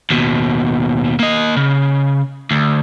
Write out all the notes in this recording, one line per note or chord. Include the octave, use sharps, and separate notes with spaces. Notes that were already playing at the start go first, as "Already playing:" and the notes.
D#2 B2
A#3 D#5
C#3
D2